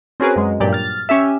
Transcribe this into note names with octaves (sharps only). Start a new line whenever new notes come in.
C4 C#4 F#4 G#4 A#4 B4
F#2 G#3
G2 A#2 F#3 G4 D5
F6 A6
C#4 G4 E5